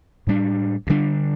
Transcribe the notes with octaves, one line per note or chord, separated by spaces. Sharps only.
A2 G3 D4
D2
D3 G3 D4